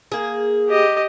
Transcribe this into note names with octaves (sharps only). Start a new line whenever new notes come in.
A#3 G#4
G4 D#5